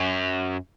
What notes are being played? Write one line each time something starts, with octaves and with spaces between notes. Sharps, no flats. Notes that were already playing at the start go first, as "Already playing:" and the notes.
Already playing: F#2